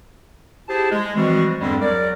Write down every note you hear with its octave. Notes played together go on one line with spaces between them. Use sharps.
E4 G4 G#4 C5 A5
G#3
E3 F3 G3 G#3 C4 F#4
E2 G2 D3 G3 G#3 C4
E2 F#3 A#4 D5